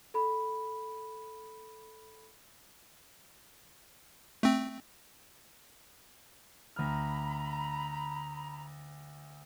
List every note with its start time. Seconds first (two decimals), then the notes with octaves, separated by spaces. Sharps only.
0.14 A4 B5
4.43 A3 C4
6.76 D2 A#5 B5 F6